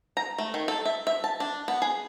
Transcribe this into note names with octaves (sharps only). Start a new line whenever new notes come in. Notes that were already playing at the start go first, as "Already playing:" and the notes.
A#5
A3
D#3
A4
E5
E5
A5
D4
B3
G#4